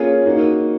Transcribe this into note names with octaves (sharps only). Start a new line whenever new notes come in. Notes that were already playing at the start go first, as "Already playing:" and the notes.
Already playing: A#3 C#4 F4 G#4 C#5
A#3 D#4 F#4